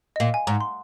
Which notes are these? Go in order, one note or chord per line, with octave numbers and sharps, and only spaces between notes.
D#5
A#2 F5
G#5
G#2 A#5
C6